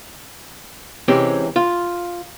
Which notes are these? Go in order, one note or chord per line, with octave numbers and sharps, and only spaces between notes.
C3 E3 G#3 C4 C#4 G4
F4